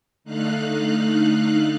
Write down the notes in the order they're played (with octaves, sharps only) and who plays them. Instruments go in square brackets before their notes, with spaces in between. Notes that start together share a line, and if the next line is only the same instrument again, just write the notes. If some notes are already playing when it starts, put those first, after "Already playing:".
[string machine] D3 A3 D#4 F5 F#6